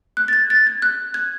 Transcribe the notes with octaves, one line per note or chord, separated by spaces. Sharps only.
F#6
A6
G#6
A6
G#6
F#6
G#6